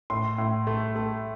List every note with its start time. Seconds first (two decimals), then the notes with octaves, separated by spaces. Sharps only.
0.10 A2 C6
0.38 A2
0.67 A3
0.95 A3